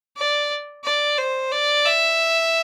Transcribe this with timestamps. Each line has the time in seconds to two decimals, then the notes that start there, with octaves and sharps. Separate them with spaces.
0.17 D5
0.85 D5
1.18 C5
1.52 D5
1.86 E5